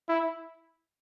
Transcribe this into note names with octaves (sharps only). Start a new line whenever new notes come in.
E4